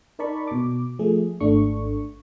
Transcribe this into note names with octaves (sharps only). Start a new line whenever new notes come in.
D#4 A#4 D5 A5 B5 C#6
B2 D6
F3 A3 G#4
G#1 A3 D4 C#6